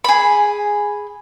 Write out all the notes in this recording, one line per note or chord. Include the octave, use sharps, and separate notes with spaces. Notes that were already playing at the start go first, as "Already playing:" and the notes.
G#4 B5